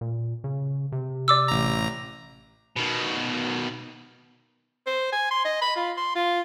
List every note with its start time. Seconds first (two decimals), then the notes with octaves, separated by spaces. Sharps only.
0.01 A#2
0.44 C#3
0.92 C3
1.28 D5 D6 E6
1.48 A1 A#5
2.77 B2 D#3
4.87 C5
5.13 G#5
5.31 C6
5.45 D#5
5.62 B5
5.76 F4
5.97 C6
6.16 F4